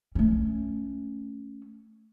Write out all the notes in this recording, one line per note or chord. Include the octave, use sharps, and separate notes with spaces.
A3 C#4